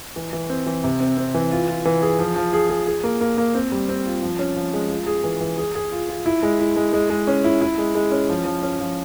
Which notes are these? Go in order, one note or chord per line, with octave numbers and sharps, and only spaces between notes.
E3
E3
C4
E3
C3
C4
C4
E3
F4
F4
E3
G#4
F3
F3
G#4
G#4
G#4
A#3
A#3
A#3
C4
G3
C4
F4
F3
C#4
F3
G#3
F4
G#4
E3
E3
G#4
G#4
F4
F4
E4
G#3
E4
G#3
G#3
G#3
C#4
E4
E4
G#3
G#3
C#4
F3
F3
C#4
F3